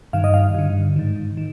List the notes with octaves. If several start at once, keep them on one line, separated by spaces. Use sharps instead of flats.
G2 D#3 F5
D#5
F5
G2 D3
G#2 D#3
D#3